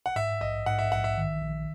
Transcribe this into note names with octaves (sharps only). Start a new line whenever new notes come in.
F#5
G#2 E5
A#1 D#5
G#2 F#5
E5
A#1 F#5
E5
D#3
A#1